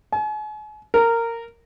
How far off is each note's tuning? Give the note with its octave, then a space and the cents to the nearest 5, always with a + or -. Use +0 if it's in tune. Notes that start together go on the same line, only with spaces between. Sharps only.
G#5 +40
A#4 -15